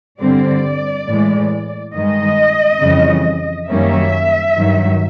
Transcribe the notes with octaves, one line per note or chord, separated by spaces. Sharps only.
G2 D3 G3 C4 D5
A2 E3 G#3
G2 D#3 G#3 D#5
F2 C#3 E3 G3
F#2 D#3 G3 A#3 C#4 E5
G2 D#3 F#3